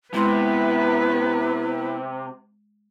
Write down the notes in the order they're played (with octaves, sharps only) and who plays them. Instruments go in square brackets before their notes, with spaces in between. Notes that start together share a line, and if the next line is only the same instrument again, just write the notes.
[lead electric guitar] C3 [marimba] G#3 C6 [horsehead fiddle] B3 B4 [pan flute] E4